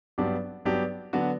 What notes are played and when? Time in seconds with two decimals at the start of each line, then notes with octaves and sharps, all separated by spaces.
0.18 G2 F#3 B3 D4 G4
0.65 G2 F#3 B3 D4 G4
1.13 D3 F#3 B3 D4 F#4